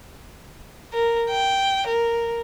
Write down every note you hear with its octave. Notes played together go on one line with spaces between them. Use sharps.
A#4
G5
A#4